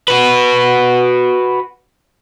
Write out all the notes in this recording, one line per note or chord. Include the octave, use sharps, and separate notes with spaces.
F#4 B4